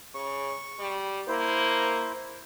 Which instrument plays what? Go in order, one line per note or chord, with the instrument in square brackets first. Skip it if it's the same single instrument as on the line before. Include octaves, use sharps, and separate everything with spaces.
[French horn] C#3 [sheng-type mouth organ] C#6
[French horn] G3
[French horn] A#3 [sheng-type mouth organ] E4 C5